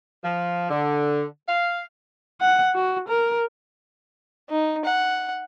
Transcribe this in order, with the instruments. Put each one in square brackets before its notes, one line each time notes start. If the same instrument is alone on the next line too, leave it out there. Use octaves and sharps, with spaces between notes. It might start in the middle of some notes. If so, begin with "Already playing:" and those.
[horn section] F3
D3
F5
[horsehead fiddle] F#5
F#4
A#4
[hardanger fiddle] D#4
F#5